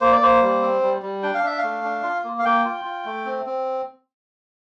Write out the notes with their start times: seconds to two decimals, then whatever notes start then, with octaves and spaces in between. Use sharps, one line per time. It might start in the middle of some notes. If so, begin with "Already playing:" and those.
0.01 A#3 C5
0.12 D5
0.21 A#3 C5
0.42 G3
0.62 C4
0.82 G3
1.02 G3
1.23 D4 G5
1.34 F5
1.43 D4 E5
1.58 F5
1.64 A3
1.84 D4
2.03 F4
2.24 A#3
2.39 F5
2.45 A#3 G5
2.65 F4
2.85 F4
3.05 A3
3.25 C4
3.46 C4